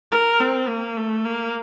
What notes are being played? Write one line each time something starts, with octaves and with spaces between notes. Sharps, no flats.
A#4
C4
A#3
A3
A#3